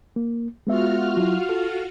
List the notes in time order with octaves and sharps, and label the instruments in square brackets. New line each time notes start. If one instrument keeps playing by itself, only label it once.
[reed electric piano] A#3
[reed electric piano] G#3 B3 E5 [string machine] F4 F#4 F6
[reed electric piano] F#3 E4
A4